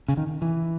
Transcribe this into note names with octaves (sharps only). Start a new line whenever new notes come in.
C#3
D#3
E3